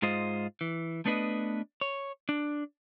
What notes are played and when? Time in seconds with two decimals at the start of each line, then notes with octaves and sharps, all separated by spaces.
0.02 G#2 G#3 F4 C5 D#5
0.61 E3
1.06 A3 B3 D4 B4 D#5
1.81 C#5
2.29 D4